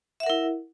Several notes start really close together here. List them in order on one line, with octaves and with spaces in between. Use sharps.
E5 F#5 A#4 E4